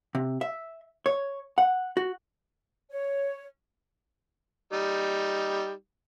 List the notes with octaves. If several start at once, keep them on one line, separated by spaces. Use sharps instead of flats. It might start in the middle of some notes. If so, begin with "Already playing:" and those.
C3
E5
C#5
F#5
F#4
C#5
G3 D#4